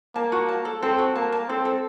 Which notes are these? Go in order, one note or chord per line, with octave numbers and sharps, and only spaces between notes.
A#3 A5
F#4
A5
A4
C4 A4
F#4
A#3 A5
A5
C4 A4
A4